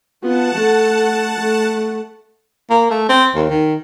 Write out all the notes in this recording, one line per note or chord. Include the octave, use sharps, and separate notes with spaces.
B3 F4 F#5 A5
A3 A4
A3
A#3
A3
C4
D#2
D#3